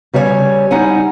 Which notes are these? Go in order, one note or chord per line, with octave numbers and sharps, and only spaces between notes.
C#3 G3 C#5 F5 G#5
G3 D#4 E4 F#5 G#5